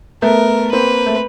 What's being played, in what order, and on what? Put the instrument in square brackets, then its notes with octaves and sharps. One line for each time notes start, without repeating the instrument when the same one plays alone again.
[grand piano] A3 B3 [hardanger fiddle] A#4
[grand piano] A#3 C4 [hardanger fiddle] B4
[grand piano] A3